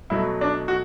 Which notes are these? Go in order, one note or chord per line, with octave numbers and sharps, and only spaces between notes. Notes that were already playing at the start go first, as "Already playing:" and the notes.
B2 F#3 A3 E4
D4
F#4